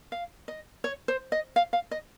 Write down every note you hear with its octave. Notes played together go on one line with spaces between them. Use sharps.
F5
D#5
C#5
C5
D#5
F5
F5
D#5